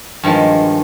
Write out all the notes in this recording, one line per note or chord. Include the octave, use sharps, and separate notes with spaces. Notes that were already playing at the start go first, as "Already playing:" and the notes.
G2 D#3 F3 G#3